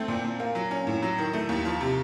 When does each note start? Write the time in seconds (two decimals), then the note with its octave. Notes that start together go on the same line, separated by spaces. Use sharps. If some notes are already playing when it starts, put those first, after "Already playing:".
Already playing: A3 C4
0.08 A#2
0.25 A#2
0.40 A#3
0.55 F#3
0.71 C#4
0.87 A2
1.02 F#3
1.18 D#3
1.33 A3
1.49 D#2
1.65 F3
1.81 C3